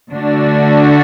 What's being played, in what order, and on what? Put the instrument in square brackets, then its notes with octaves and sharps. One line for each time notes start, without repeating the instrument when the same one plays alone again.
[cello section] D3 A3 D4 F#4